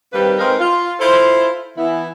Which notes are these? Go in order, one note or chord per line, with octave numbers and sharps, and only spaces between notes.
D#3 G3 A#3 C4 B4
G#3 C4 D#4 A#4 B4 F5
F4
E4 F4 A4 C5
E3 B3 E4